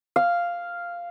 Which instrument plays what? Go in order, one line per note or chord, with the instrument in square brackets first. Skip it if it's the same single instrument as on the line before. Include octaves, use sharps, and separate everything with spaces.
[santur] F5